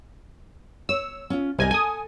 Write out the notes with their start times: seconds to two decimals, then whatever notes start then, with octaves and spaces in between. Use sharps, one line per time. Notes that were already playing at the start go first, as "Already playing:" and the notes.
0.89 C#5 E6
1.30 C#4 F4
1.58 C2 G4 A#4 D#5 G#5
1.71 A4 G#5 D#6